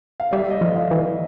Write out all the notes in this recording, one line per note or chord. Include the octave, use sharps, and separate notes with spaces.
F5
G3 D5 E5
D#5
F3 E5
D#5 F5
E3